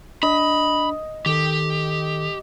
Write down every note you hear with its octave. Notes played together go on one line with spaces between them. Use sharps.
D4 D#5 B5
D#3 G4 A4